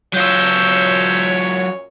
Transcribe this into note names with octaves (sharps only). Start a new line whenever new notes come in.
F#2 A#2 F#3 F4 C#5 E6 G6